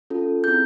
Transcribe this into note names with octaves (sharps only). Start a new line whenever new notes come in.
C#4 F4 A4
C4 E4 G#4 G6